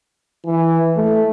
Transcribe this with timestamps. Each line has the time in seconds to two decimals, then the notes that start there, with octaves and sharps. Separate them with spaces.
0.46 E3
0.97 A3